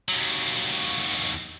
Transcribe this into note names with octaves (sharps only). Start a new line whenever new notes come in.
D#2 F#3